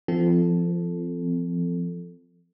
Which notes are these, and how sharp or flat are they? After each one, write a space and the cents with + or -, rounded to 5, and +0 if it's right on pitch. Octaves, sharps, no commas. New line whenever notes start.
F3 -20 C4 -25 A4 -5